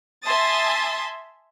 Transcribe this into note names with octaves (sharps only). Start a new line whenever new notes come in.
E5 G#5 A5 C6 D#6 A6